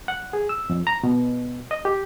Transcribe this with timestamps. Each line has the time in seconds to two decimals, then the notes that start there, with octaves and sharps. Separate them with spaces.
0.08 F#5
0.33 G#4
0.49 E6
0.70 F2
0.87 A#5
1.04 B2
1.71 D#5
1.85 G4